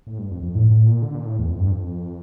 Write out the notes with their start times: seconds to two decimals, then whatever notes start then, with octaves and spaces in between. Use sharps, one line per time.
0.07 A2
0.18 G2
0.31 F2
0.43 F2
0.55 A2
0.71 A2
0.86 A#2
1.02 D3
1.15 A#2
1.26 A2
1.39 E2
1.50 F2
1.60 G2
1.72 F2